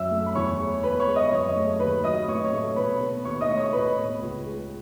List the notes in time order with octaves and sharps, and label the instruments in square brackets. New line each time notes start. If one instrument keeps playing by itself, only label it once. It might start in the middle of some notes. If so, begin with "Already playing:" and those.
Already playing: [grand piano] F#2 E5 E6
A3
B5
E2 C#5 C#6
G#3
B3 B4 B5
C#5 C#6
G#3
D#5 D#6
F#2 C#5 C#6
A3
D#2 B4 B5
F#3 D#5 D#6
A2 C#5 C#6
C#5 C#6
A3
B2 B4 B5
B3
D#2 C#5 C#6
D#5 D#6
A3
C#5 C#6
A2 B4 B5
B3
C#2
G#3